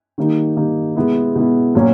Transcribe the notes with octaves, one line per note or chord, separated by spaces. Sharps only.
D#3 G3 A#3 D#4
D#3 G3 A#3 D#4
B2 G#3 B3 E4
B2 G#3 B3 E4
A#2 F#3 A#3 C#4